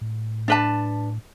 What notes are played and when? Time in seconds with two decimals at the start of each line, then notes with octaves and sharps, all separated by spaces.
0.01 A2
0.48 D4 B4 A5